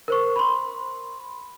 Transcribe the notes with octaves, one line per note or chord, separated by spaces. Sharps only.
A#4 C5 C#6
B5 C6